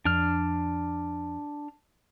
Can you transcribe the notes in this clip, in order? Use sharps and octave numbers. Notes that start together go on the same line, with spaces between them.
F2 D4 F6